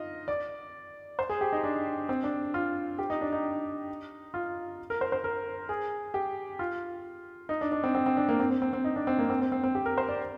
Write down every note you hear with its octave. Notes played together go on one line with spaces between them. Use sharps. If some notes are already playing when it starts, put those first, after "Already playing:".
Already playing: D#4 F4 D#5
D5
C5
G#4
G4
D#4
D4
C4
D4
F4
G4
D#4
D4
D#4
F4
A#4
C5
C5
A#4
G#4
G4
F4
D#4
D4
D4
C4
C4
C4
D4
A#3
C4
C4
C4
C4
D#4
D4
C4
A#3
C4
C4
C4
C4
G4
A#4
C5
D5